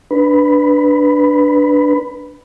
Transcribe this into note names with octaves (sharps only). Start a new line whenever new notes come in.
D4 B4 B5